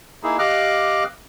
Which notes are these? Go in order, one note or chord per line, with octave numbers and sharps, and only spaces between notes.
A#3 D#4 E4 G#4
G4 D#5 F5 D6 F6 F#6